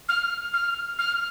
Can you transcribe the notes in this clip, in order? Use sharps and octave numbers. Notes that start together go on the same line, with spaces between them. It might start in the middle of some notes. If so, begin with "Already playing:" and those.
F6
F6
F6